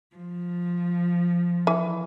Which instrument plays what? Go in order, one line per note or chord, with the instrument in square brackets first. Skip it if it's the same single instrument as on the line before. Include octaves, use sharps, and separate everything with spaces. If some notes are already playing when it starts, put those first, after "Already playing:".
[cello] F3
[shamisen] E3